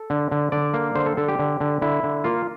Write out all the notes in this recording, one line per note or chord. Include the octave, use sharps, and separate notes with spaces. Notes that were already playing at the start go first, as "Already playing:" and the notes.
Already playing: A4
D3
D3
D3 D5
A#3
D3 C5
A4
D3 A4
G4
D3
D3
D3 E4
D3
A#3 F4